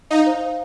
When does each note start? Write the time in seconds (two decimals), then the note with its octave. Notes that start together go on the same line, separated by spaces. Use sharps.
0.10 D#4 F5
0.26 C5
0.42 F5